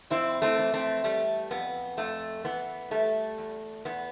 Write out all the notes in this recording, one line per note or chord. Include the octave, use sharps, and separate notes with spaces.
F2 C4 E4
A3 C4
E3
A3 C4
G3 A3
F2 B3
F2 A3
E3 B3
G3 A3
E2
E2 B3